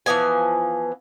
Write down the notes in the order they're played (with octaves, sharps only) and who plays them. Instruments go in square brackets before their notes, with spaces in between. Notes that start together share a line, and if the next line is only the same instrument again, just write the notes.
[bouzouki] E3 F3 B3 G#5